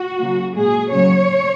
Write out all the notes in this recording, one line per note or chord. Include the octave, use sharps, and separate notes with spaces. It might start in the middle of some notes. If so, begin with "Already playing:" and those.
Already playing: F#4
C#3 F#3 A#3
A#2 G#3 G#4
C#3 F#3 A#3 C#5